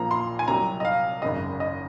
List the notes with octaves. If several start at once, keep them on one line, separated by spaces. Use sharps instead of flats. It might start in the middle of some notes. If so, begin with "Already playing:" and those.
Already playing: A#1 A#2 F3 A#3 A#5
C6
G#5
C2 C3 F#3 A#5
D#5
F5
G#1 F#2 C#3 D#5
D#5